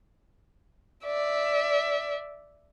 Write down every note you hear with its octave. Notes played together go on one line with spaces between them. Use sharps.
D5 E5